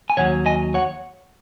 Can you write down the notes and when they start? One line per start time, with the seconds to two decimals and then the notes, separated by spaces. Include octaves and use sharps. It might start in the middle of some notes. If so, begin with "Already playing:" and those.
0.10 G#5
0.17 D#2 D#3 F#3 C#5 F#5
0.46 D#5 G#5
0.74 C#5 F#5